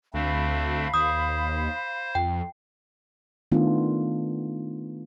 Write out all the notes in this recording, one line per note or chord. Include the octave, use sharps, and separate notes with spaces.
D2 A3 C4 D4 F5 B5
D#2 C5 D#6
F2 G5
D#3 A3 B3 D4 F4